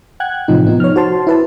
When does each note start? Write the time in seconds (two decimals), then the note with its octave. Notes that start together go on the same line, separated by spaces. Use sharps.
0.20 F#5 G5 F#6 G#6
0.48 A2 C3 F3 D#4
0.67 F3 B3 D#4
0.80 C#5 F6
0.96 F#4 C5 A5 C6
1.27 E4 B4 A5